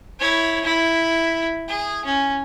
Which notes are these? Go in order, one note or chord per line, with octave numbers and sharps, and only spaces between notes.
E4 C#5
E4
G#4
C#4